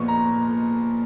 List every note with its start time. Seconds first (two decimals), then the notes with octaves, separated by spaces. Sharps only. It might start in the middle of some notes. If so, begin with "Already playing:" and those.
Already playing: A#2 F3 B3 C#6
0.08 A#5